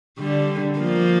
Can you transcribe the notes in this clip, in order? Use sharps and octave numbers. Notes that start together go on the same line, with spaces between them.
D3 G3
F3 A#3